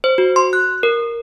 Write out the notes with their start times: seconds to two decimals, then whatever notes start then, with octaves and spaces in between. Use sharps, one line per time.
0.04 C5
0.18 F#4
0.36 C6
0.53 F#6
0.83 A#4